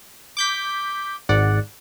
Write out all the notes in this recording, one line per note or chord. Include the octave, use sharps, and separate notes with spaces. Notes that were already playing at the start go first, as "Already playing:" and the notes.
D6 G6 B6
G#1 G#2 D5 F#5